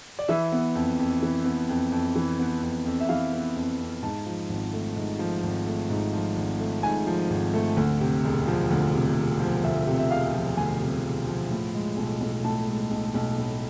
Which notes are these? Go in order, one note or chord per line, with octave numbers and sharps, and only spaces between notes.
D5
E3 E5
B3
F2
F2
E3
B3
F2
F2
E3
B3
F2
F2
E5
E3 F5
B3
F2
F2
G#2 A5
F3
G#1
A3
G#2
F3
G#1
A3
G#2
F3
G#1
A3
G#2 G#5
F3
G#1
A3
D2
C3
E1
F3
D2
C3
E1
F3
D2 E5
C3
E5
E1 F5
F3
D2 G#5
C3
E1
F3
A2
G#3
B1
B1
A2 A5
G#3
B1
B1
A2